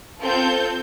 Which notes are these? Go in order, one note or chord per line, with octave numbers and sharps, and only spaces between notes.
C4 F4 A4 G6